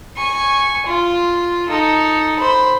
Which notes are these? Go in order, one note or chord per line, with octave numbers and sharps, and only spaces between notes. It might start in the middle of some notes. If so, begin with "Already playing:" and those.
G#5 C#6
F4
D#4 A4
C5 B5